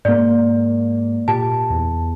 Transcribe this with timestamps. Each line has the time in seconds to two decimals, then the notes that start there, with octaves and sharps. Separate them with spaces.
0.05 G#2 A#3 D5
1.28 A#2 G4 A5
1.70 E2